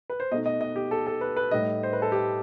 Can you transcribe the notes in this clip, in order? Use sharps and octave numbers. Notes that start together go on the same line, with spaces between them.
B4
C5
B2 A3 D#4 D#5
D#5
D#5
G4
A4
A4
B4
B4
A2 G3 D#4 D#5
C5
B4
A4
G4